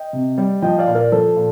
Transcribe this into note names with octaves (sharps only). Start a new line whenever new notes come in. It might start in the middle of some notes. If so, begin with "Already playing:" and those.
Already playing: D#5 G5
C3
G3
F3 D#5 G5
D5 F5
A#2
A#4 D5
F3 A4 C5
A#2